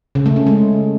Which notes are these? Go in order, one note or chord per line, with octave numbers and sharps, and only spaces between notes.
C#3
A3
C#4
G#3